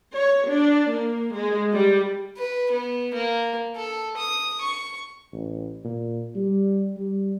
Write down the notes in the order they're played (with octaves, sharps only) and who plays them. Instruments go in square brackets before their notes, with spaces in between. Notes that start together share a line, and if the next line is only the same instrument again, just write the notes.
[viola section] C#5
D4
A#3
G#3
G3
[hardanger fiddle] B4
B3
A#3
A4
D#6
C#6
[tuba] A1
A#2
G3
G3